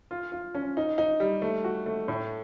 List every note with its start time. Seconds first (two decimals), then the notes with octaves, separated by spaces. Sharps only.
0.11 F4
0.32 F4
0.55 C#4
0.77 D#4
0.98 D#4
1.20 G3
1.42 A3
1.64 F#4
1.86 A3
2.08 A2